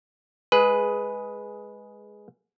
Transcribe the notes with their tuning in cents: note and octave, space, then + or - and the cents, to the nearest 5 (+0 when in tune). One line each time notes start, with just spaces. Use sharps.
G#3 +0 G#4 +10 B4 +0